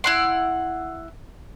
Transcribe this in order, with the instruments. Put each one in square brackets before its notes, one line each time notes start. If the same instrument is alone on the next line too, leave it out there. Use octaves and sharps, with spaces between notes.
[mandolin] E4 F#5 C6